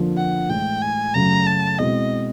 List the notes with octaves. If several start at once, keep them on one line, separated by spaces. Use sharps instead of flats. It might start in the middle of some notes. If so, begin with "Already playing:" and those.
Already playing: F2 D3 F3 A#3 D4
F#5
A2 E3 G#3 G5
G#5
F#2 C#3 F#3 A3 A#5
A5
B2 G#3 C4 E4 D#5